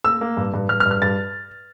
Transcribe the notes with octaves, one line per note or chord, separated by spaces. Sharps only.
A#3 E6
A#3
G2
G2
G2 F6
F6
G2
F6
G2 A6